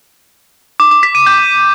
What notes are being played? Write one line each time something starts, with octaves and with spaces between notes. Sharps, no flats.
D6
D6
B6
D#7
G6